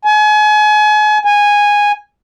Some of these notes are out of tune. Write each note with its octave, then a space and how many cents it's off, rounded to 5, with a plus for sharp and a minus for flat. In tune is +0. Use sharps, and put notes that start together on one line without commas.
G#5 +35
G#5 -10